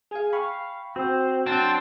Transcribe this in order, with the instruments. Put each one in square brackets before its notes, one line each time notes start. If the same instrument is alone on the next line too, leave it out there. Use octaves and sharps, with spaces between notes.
[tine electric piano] G#4 F5 [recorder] G#5
[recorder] F5 [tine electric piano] G5 B5 C#6
[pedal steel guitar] C4 [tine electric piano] F#4 [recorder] C5
[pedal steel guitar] F#3 D4 [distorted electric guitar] C4 [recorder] A5